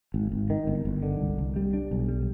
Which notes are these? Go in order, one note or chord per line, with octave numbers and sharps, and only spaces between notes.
G#1
G#1
D#3
G1
G1
D3
C2
C2
G3
D4
B1
G3